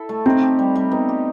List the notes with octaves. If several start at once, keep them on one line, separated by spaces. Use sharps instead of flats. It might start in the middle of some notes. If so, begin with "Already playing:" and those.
Already playing: E4 A4
A3
C4 D#4
G4
G3
G3
B3 D#4
G4